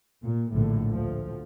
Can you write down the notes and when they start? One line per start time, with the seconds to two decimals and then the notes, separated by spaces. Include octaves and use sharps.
0.23 A#2
0.53 A#1 A2 D3
0.90 D2 F3